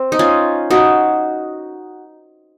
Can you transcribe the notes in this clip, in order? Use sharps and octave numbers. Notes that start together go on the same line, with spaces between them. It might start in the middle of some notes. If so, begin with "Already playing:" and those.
Already playing: C4
D#4
C#4 F4
D#4 F#4